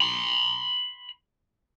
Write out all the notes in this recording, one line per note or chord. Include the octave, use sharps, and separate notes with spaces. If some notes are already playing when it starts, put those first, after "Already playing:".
B5 C6